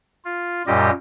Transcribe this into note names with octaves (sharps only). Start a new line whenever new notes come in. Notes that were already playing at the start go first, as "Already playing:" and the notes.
F4
F#2 A#2 G3 G4 D#5